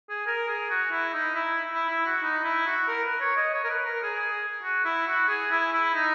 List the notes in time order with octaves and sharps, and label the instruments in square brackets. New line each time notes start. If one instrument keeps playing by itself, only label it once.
[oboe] G#4
A#4
G#4
F#4
E4
D#4
E4
E4
E4
F#4
D#4
E4
F#4
A#4
B4
C#5
D#5
C#5
A#4
B4
A#4
G#4
G#4
F#4
E4
F#4
G#4
E4
E4
D#4